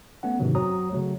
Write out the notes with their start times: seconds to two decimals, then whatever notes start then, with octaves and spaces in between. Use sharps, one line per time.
0.23 A3 B3 C#4 F#5
0.40 G#2 C3 D#3 E3 F#3
0.55 F#2 F#3 C4 A#5 D#6
0.92 C#3 F#3 A3